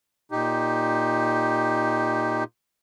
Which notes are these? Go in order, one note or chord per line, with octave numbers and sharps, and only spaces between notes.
A#2 D#4 G4